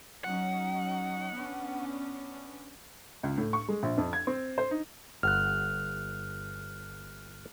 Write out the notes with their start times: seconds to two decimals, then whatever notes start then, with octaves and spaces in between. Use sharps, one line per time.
0.24 F#3 C#4 D#4 F#5
1.34 B3 C#4 D4
3.23 C#2
3.38 A2
3.53 C#6
3.69 G#3
3.83 A#1
3.98 F2
4.13 G#6
4.27 C4
4.58 C5
4.71 D#4
5.23 G1 F#5 F6 F#6